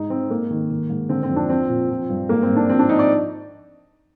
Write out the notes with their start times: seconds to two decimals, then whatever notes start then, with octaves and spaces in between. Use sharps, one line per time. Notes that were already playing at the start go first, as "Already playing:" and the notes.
Already playing: G#2 D#4
0.10 G#2 C4
0.30 G#2 A#3
0.50 D#3
0.70 D#3
0.89 G#2
1.09 D3 C4
1.23 C4
1.30 F2
1.36 D4
1.49 F3 C4
1.69 A#2
1.90 F3
2.09 G2
2.29 G#2 A#3
2.42 C4
2.49 G#2
2.56 D4
2.69 F3 C4
2.79 D4
2.89 F3 D#4
2.99 D5